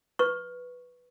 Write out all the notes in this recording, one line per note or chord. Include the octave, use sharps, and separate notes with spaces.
B4 C#6